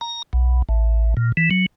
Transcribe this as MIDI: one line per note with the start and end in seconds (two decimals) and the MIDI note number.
0.01 0.22 82
0.33 0.62 35
0.69 1.14 33
1.17 1.32 46
1.37 1.49 52
1.51 1.66 54